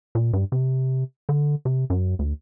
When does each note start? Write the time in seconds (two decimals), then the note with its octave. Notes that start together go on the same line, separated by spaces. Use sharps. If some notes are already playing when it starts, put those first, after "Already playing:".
0.15 A#2
0.33 G2
0.52 C3
1.29 D3
1.65 C3
1.90 F#2
2.19 D2